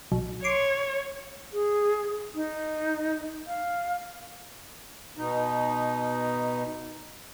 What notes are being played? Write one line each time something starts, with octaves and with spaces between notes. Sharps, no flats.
B1
C#5 C6 D6
G#4
D#4
F5
B2 D#4